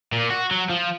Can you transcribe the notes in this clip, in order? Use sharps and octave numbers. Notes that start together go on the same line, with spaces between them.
A#2
F#4
F#3
F3